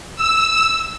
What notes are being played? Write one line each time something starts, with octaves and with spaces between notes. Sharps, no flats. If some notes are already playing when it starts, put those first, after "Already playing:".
E6